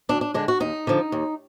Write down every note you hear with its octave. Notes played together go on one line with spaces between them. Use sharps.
D2 D4
D4
D3 G#3 D4
F#4
D#2 D#4
D3 F3
D#2